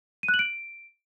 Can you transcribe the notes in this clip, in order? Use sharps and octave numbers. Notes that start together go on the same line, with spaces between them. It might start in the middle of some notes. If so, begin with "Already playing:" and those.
D#7
F#6
F#7
D7